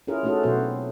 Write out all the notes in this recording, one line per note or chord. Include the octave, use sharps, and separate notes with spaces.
C#4 E4 F4 G#4 A#4
A3 C#4 D#4 F#4 G#4 A4
B2 F#3 B3 F#4 C5
C4